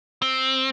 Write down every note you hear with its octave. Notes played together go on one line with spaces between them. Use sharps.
C4